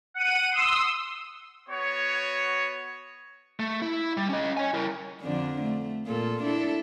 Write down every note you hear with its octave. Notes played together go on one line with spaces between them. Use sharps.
F#5 D#7
C6 D#6 E6
B3 F#4 C#5
A3
E4
G3
C#4 D#5
C#5 G#5
E4 A#4
F2 D3 D4
A3
A#2 F4 A4
D4 E4 A4